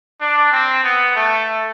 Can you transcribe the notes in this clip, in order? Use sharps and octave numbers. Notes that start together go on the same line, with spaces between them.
D4
C4
B3
A3